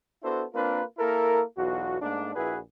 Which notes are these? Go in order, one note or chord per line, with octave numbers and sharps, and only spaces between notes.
B3 D4 E4 F#4 A4 C5
A#3 C4 D4 F4 A#4 B4
A#3 E4 A4 A#4
B1 E2 F4 F#4
G#2 A3 A#3 D4
A#1 E4 F#4 G#4 B4